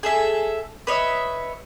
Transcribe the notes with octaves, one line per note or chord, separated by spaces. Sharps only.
G#4 A4 E5
B4 C#5 D#5 E5